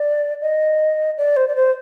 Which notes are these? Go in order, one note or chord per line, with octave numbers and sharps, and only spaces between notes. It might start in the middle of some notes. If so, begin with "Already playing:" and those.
Already playing: D5
D#5
D5
C5
D5
C5